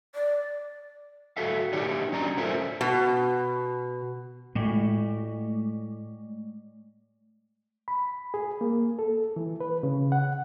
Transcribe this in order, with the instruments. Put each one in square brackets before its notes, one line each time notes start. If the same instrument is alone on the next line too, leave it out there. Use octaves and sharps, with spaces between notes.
[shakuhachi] D5
[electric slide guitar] F#4 A4 E5 F5
D4 D#4 G4 C#5 D5 E5
F#3 C#4 D5 A#5
C#4 F4 A4 A#4 C5 E5
[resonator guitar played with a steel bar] B2
[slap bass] A2 [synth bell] G#3 A3
[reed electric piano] B5
G#4
A#3
A4
E3
B4
C#3
F#5